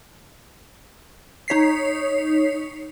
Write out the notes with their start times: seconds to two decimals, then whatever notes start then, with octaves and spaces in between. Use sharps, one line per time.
1.48 D#4 C#5 B6 C7